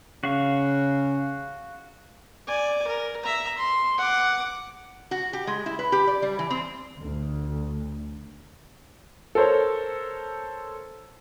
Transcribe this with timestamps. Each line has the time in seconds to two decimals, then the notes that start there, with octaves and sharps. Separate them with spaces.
0.24 C#3 F#4 F5 C#6
2.47 D5 G#5
2.87 A#4
3.23 E5 A#5
3.58 C6
3.98 F#5 D6
5.11 F#4
5.33 G4
5.47 G#3
5.66 E4
5.79 B4
5.92 G4
6.07 D5
6.22 G3
6.39 E3
6.50 C4
7.01 D2
9.35 A4 A#4 C5 C#5